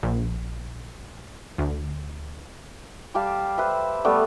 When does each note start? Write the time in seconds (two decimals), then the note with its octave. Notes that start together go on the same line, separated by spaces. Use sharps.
0.03 A#1
1.58 D2
3.14 G3 G4 F5 A5
3.58 B4 C5 E5
4.04 G3 A3 B3 D5